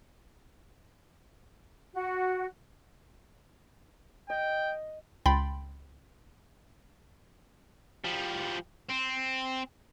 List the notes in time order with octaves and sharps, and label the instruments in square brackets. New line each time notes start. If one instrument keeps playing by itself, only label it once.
[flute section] F#4
[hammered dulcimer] D#5 [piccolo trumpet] G5
[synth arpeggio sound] C#2 G5 B5 C6 A6
[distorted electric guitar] F3 G3
C4